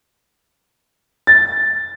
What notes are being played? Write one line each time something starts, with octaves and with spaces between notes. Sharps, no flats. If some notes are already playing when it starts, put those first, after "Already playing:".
A6